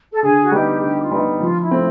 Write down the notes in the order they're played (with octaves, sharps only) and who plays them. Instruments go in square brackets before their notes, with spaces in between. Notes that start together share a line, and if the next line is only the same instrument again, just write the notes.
[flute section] A4
[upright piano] D3 [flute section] G#4
[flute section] F#4
[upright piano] G3 B3 D#4 [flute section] G4
[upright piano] D3 [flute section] G4
[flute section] F4
[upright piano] G3 B3 D#4
[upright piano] F3 [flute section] F4
[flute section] E4
[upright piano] A3 C4 F4